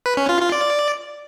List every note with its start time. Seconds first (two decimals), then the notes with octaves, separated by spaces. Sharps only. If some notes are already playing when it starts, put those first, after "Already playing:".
0.06 B4
0.17 C#4
0.29 F4
0.41 F4
0.52 D5